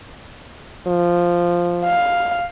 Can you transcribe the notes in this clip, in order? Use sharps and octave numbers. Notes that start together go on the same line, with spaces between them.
F3
F5